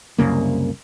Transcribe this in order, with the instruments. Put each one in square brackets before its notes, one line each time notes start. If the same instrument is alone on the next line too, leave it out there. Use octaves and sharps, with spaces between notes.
[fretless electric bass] C2 F#2 C#3 A#3